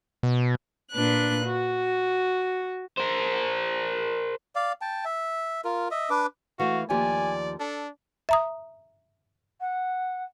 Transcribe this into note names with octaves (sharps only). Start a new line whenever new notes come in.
B2
A#2 D4 B4 F#6
F#4
A#4 C5
D5 F5
G5 A5
E5
F4 A#4
D#5 E5
D4 B4 D6
E3 A3 F#4 F5
D#2 F3 G4 D5 G#5
D4 A4
E5 A#5 D#6
F#5